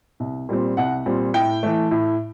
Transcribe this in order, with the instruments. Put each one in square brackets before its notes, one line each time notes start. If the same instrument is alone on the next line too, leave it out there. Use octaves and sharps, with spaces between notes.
[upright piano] C2
A#2 G3 C4
C2 F#5
A#2 G3 C4
A2 G5
E3 A3
A2